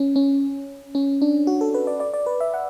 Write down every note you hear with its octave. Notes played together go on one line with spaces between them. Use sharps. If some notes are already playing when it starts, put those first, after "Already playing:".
Already playing: C#4
C#4
C#4
D4
F#4
A4
B4
D5
D5
D5
B4
E5
F#5